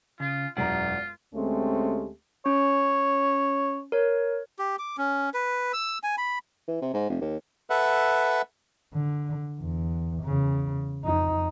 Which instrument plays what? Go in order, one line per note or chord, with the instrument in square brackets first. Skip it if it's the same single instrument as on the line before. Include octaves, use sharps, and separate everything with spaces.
[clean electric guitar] C#3 [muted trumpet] F4
[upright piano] E1 F#2 A#5 [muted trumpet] F4 [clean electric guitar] D5 F#5
[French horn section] D2 G#3 A3 C4 C#4 G4
[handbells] C#4 [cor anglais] C#5
[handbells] A#4 C#5
[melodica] G4
D6
C#4
B4
E6
G#5
B5
[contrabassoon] E3
C3
G#2
F1
D#2
[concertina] A4 B4 E5 F#5
[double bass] D3
E2
E2 C#3
F2 D#4